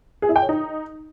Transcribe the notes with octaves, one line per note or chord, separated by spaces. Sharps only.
G#4
E4
G5
C#5
D#4